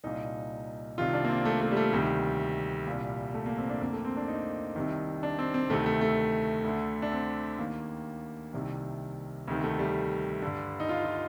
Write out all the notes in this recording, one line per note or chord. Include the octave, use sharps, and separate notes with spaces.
C2 A#2 D#4
C2 C3 D#3 F4
D4
A#3
C4
A3
A3
G3
A3
D2 C3 D#3 G3
C2 A#2
A3
A#3
C4
D4
F2 D3 A#3
A3
C4
D4
D#4
C2 C3 D#3
D4
C4
C4
D2 C3 D#3 A3
A3
A3
D2 D3
D4
C4
D#2 D#3 A#3
C2 C3 D#3
D2 C3 D#3
A3
G3
G2 D3
D#4
F4
F4